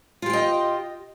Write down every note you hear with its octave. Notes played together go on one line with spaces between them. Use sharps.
F4 G4 D#5 G5